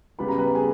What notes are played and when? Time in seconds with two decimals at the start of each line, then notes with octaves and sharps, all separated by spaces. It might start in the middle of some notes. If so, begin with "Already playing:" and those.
0.19 C#3 G3 B3 B5
0.29 A#5
0.38 B4 B5
0.55 G#4 G#5